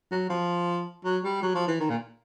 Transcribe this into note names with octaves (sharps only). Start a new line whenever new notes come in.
F#3
F3
F#3
G3
F#3
F3
E3
D#3
A#2